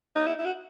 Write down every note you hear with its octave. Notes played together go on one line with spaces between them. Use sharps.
D#4
E4
E4
F#4